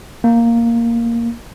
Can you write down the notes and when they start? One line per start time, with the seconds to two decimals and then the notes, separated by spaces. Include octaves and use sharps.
0.24 A#3